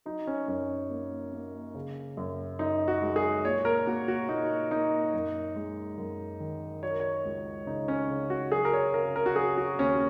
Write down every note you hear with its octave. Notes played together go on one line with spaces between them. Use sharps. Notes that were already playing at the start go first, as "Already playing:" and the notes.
F#3 D#4
C#4
F#2 C#4
A#3
A#3
C#3
F#2
F#2 D#4
F#4
G#3
G#4
A#2 C#5
A#4
A#3 F#4
F#4
A#2 D#4
A#3 D#4
F#2
G#3
F#2
D#3
F#3 C#5
A#4
C#5
C#2
C#3 D#4
C#4
C#3
F#4
F#3 G#4
A#4
C#5
C#3 A#4
A#4
F#4
F#3 G#4
F#4
D#2 C#4